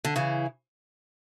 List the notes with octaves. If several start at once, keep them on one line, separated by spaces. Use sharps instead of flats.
D3
C#3 E3